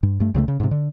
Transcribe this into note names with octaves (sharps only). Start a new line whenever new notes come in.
G2
G2 A3
C#2 C#3 F3 A3
C#3
G#2 C3
D3